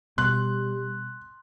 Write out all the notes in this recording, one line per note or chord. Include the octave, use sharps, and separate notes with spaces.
B2 G3 C6 F#6